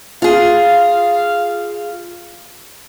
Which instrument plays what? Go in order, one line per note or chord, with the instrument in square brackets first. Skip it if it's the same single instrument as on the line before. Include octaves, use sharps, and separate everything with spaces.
[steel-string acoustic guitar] F4 G#4 [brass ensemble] F5